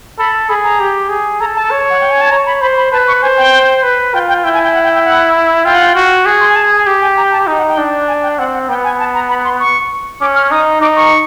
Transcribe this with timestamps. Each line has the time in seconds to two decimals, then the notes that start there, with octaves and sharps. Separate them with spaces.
0.19 A4 B5
0.49 G#4 B5
0.64 A#5
0.80 G4
1.09 G#4
1.40 A4 A#5
1.55 A5
1.71 C#5
1.90 F#5
2.01 G5
2.11 G#5
2.21 A5
2.32 C#5 A#5
2.46 B5
2.61 C5 B5
2.77 B5
2.92 B4 A5
3.07 C#6
3.22 C5 G#5
3.37 G5
3.83 B4
4.14 F4 G5
4.29 G5
4.44 E4 G5
4.54 G#5
4.63 G5
4.74 F#5
4.84 G5
4.95 G5
5.05 F#5
5.65 F4 G5
5.75 F#5
5.86 G5
5.95 F#4
6.26 G#4
6.41 C6
6.49 G#5
6.56 A5
6.72 G#5
6.87 G4
7.02 G#5
7.17 A#5
7.32 A5
7.47 D#4 G5
7.58 F#5
7.68 G5
7.78 D4
8.08 G#5
8.23 G5
8.38 C4 F#5
8.54 F#5
8.69 B3 G5
8.84 G#5
8.99 A5
9.14 A#5
9.30 B5
9.45 C6
9.60 C#6
10.21 C#4 D6
10.36 F6
10.51 D#4 D#6
10.81 D#4 D6
10.96 C#6